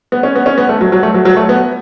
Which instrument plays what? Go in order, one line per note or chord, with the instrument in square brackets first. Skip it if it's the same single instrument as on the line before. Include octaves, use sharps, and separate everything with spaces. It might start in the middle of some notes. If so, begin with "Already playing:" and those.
[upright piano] B3
C#4
B3
C#4
B3
A3
F#3
F#3
A3
F#3
F#3
A3
B3